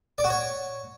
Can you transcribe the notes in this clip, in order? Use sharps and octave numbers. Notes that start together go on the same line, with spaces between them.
D5
F#4
C#5